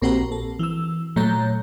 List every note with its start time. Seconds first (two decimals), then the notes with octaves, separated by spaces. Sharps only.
0.02 A#1 A#3 C4 F#4 G4 A#4
0.32 A4
0.59 E3 E6
1.16 A#2 F#3 A3 C#5 A#5 G6